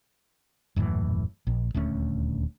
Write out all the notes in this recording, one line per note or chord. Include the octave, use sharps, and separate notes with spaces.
D#1 F#2 A2 E3
A#1
D#1 D2 A3 C#4